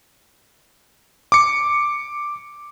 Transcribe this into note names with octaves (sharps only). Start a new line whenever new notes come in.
D6 C#7